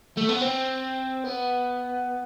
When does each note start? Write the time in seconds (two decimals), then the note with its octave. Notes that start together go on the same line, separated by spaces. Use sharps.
0.18 A3
0.29 B3
0.41 C4
1.25 B3